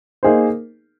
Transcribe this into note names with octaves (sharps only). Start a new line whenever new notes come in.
A#3 D#4 G#4 C5